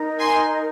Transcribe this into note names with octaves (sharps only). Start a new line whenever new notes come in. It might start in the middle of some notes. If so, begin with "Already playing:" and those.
Already playing: D#4 A#4 D#5 A#5
G#5 C6